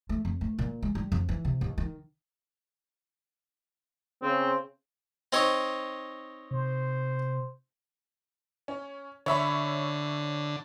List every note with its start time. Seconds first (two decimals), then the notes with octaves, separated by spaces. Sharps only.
0.09 A3
0.25 F2
0.41 A3
0.59 A#2
0.82 G#3
0.95 G3
1.12 F2
1.29 E3
1.45 C3
1.61 D#2
1.78 D#3
4.22 C#3 C4
5.33 C4 D#4 C#5
6.51 C3 C5
8.68 C#4
9.26 D3 C#5 E5 B5